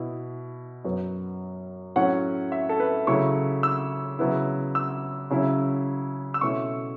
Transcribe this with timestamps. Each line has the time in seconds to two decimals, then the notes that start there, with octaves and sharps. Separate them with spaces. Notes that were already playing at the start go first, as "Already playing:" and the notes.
Already playing: B2 B3 E4
0.85 F#2 F#3 B3
1.96 A2 F#3 C#4 F#5
2.52 E5
2.69 A4
2.80 B4
3.07 C#3 F#3 A3 E4 C#6
3.63 E6
4.19 C#3 F#3 B3 E4
4.75 E6
5.30 C#3 F#3 C#4 E4
6.34 E6
6.41 B2 A3 C#4 E4 C#6